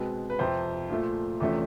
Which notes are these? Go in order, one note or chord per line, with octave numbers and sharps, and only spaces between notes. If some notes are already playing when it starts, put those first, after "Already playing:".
Already playing: B2 G#3 C4 B4
B4
F2 C3 F3 C5
A#2 F3 A3
E2 C3 F3 A3 C#4